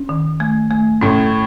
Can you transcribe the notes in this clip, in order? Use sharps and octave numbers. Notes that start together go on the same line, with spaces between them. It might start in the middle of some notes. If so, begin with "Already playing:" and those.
Already playing: C#4
D#3
A3
A3
A2 C#4